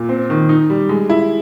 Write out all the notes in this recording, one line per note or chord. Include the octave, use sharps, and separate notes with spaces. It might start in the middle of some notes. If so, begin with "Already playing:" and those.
Already playing: A#2
C4
D#3
D#4
G3
G#3
E4